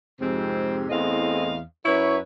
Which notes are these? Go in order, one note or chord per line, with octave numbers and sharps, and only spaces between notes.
F2 G#2 C3 G#3 C4
E2 A2 C4 G#4 D#5 F5
F#2 E4 B4 C#5